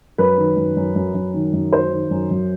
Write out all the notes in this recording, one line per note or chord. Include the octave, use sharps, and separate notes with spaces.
F#2 B4
D#3
F#2
F#2
F#2
F#2
D#3
F#2
F#3 C5
D#3
F#2
F#2